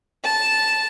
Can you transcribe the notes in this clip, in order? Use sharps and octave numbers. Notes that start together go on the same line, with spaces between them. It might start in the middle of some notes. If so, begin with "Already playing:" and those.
A5